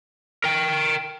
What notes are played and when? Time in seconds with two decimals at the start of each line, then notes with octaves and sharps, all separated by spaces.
0.44 A#4 G5